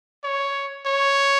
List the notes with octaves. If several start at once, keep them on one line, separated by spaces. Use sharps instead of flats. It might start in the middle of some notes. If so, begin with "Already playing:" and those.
C#5
C#5